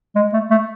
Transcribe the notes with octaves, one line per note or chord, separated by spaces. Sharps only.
G#3
A3
A3